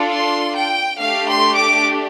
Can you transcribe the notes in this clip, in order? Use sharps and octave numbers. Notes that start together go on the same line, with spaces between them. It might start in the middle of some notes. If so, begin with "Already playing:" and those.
Already playing: D4 F4 A4
C6
G5
A3 D4 G4 F5
C6
D6